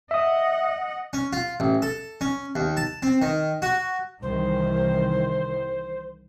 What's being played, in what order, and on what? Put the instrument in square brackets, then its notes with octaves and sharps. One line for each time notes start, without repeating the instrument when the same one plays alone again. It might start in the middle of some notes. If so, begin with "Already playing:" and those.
[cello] D#5 F#5 [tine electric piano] E5 D#6
[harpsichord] C#4
F4
A1
A4
C#4
D#2
A5
C4
D#3
F#4
[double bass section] C2 D#3 E3 [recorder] C5